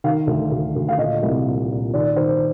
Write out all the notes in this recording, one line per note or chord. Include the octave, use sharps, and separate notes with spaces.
D#3 F5
D2
D2
D2
F5
A#2 D#5
C2
A#2
A#2
D#3 D5
D#3 C5